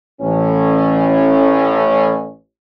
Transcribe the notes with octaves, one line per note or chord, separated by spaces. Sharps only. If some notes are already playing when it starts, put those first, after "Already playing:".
A1 A2 C#4